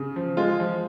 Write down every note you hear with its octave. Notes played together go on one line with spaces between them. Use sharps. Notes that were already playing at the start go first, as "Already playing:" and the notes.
Already playing: C#3
F3
G#3 F4
F3